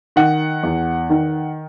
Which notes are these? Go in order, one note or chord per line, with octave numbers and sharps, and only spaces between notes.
D#3 F#5
E2
D#3